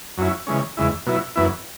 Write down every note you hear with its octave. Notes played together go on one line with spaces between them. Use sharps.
F#2 F#3 C#4 E4
C#3 E3 G#3 C#4
E2 C#3 G#3 E4
B2 F#3 E4
F#2 E3 B3 E4